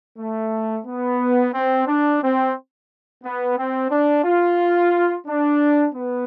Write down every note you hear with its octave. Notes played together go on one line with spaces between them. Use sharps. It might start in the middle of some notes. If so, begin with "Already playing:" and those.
A3
B3
C4
D4
C4
B3
C4
D4
F4
D4
B3